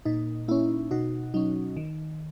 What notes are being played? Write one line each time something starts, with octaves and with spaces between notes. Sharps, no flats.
A#2 D#4
A#3 C#4 E4
B2 D#4 F#4
F#3 C#4 D#4
D#3